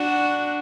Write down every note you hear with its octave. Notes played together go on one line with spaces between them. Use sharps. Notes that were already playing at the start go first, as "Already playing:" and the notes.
Already playing: D4 F#4